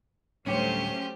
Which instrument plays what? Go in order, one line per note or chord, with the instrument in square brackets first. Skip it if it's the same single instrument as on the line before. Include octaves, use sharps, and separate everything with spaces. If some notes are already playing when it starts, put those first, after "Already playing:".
[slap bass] D1 G3 D4 [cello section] F#3 A3 C5 [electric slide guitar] C#4 [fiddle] G4